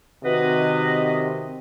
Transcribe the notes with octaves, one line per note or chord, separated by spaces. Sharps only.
C3 D#3 F#4 B4 D#5